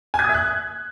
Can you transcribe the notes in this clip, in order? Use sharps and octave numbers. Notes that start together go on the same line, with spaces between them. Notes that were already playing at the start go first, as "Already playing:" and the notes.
G#5
G#6
D#6
E5
F#6